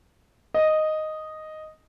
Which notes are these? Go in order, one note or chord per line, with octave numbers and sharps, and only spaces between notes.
D#5